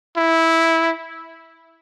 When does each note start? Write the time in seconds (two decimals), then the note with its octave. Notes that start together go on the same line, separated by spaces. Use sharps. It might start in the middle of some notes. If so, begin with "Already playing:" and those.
0.17 E4